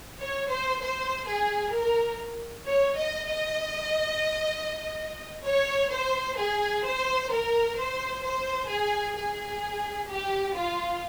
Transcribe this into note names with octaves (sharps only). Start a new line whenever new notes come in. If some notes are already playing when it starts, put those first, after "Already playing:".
C#5
C5
C5
G#4
A#4
C#5
D#5
D#5
C#5
C5
G#4
C5
A#4
C5
C5
G#4
G#4
G4
F4